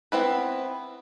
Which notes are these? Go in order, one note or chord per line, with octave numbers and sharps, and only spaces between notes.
B3 C4 E4 B4